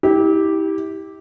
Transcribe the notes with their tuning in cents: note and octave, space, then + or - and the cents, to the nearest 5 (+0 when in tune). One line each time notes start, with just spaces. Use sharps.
E4 -35 G4 +0